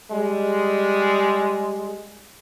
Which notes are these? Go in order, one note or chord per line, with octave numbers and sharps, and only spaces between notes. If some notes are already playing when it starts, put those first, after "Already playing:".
G3 G#3